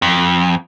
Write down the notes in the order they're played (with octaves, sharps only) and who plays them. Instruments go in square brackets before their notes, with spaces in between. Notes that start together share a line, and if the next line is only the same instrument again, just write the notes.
[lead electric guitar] F2